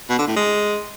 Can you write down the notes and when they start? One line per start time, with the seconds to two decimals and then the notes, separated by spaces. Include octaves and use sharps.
0.09 B2
0.18 D3
0.27 A2
0.36 G#3